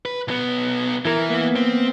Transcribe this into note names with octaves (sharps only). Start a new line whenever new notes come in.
B4
B1 B3
E3 E4 A#4
A#3 B3
C4